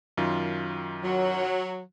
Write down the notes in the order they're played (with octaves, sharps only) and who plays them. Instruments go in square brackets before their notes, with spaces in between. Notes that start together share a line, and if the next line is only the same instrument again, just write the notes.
[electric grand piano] F#2 D#3 F4
[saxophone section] F#3